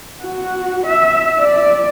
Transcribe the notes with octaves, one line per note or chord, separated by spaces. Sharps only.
F#4
E5
D5